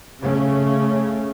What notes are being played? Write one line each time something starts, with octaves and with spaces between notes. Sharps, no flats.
C#3 A3 C#4